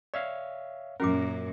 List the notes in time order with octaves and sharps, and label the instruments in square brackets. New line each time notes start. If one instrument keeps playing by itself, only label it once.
[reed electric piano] C#5 E5 F5 [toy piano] D5
[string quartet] F#2 A#2 [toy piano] C#4 F#4 D6 [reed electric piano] A#4